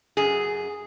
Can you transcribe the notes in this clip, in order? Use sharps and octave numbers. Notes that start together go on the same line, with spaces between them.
F#2 G#4